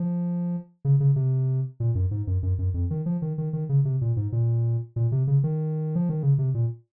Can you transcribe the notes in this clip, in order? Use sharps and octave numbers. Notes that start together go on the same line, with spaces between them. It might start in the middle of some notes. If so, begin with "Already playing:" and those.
Already playing: F3
C#3
C#3
C3
A#2
F#2
G#2
F#2
F#2
F#2
F2
D#3
F3
D#3
D#3
D#3
C#3
C3
A#2
G#2
A#2
A#2
C3
C#3
D#3
F3
D#3
C#3
C3
A#2